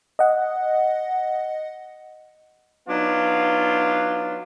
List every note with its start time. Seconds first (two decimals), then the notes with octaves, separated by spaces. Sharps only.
0.19 D#5 F#5
2.87 F#3 B3 D4 D#4 F4